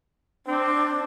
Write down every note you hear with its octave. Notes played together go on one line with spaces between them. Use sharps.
C4 D4